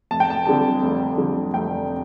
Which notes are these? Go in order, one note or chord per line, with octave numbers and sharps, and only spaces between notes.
F1 A5
G5
A5
F2 D3 G3 A5
F1
F2 D3 G3
F1 G5